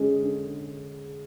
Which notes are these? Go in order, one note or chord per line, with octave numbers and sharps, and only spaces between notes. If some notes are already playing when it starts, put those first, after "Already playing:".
Already playing: D3 G#3 C#4 G#4
D3